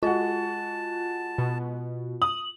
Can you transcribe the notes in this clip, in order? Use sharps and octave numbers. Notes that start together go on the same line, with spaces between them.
G#3 F4 F#4 A5
B2
D#6 F#7